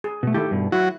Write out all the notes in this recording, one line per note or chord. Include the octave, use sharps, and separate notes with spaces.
G#4
B2 A3
D#3 A3 E4 G4 A4
G2 B2
F#3 E4 F#4